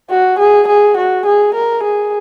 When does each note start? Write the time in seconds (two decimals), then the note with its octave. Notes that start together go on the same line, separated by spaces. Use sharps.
0.10 F#4
0.39 G#4
0.68 G#4
0.97 F#4
1.25 G#4
1.54 A#4
1.83 G#4